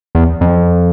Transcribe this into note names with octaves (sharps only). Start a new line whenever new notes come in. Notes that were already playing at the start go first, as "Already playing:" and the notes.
E2
F2